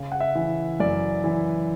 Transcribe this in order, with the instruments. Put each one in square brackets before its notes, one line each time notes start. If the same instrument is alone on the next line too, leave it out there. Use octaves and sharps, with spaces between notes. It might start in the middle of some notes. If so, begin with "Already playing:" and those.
Already playing: [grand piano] C#3
F#5
E5
E3
F#2 D5
E3